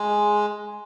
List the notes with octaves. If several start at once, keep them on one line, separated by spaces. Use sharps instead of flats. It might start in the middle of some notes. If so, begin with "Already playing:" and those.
Already playing: G#3